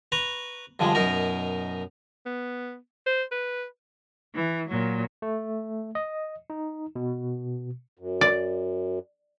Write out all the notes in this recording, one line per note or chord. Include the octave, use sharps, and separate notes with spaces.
B4 A#5 C#6
G2 D3 F3 G#3
F#2 B2 D#4 A#4
B3
C5
B4
E3
A#2 F#3
A3
D#5
D#4
B2
F#2
D5